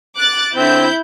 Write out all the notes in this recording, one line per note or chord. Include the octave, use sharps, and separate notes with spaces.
D6 F#6 A6
D3 C4 E4 G6